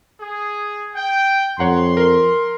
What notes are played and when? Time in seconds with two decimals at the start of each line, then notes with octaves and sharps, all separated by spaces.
0.21 G#4
0.96 G5
1.59 F2 C#5 F#5 A#5 C6
1.97 A#4